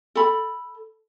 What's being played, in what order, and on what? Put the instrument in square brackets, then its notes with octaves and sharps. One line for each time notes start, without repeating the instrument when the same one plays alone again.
[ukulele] A4 B5